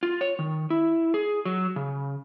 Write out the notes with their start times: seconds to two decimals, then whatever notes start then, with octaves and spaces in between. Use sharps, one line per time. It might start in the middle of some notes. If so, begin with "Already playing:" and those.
0.03 F4
0.21 C#5
0.39 D#3
0.70 E4
1.14 G#4
1.45 F#3
1.76 C#3